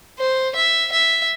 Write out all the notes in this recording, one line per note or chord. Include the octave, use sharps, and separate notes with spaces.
C5
E5
E5